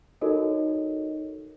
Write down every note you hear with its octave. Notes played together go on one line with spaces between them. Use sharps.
D#4 F#4 A4 A#4 C#5 D#5